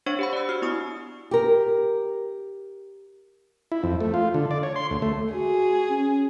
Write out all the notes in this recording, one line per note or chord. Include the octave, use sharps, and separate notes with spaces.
D4 C5 C#5 F5 C#6
G4 F#5 B5
D5 E6
F#4 F6
B3 E4 C#6 D#6
G4 A#4
E4
F2
A3
F4
D3
D5
C#5
C6
D2
A3
F#4 G#4
C#4